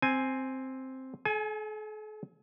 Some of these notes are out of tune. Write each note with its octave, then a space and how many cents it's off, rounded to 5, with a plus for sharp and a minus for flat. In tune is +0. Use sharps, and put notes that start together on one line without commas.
C4 +0 G#5 +0
A4 -45 G#5 +15